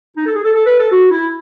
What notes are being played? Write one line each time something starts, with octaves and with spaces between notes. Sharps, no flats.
D#4
A4
G#4
A4
A4
B4
A4
F#4
E4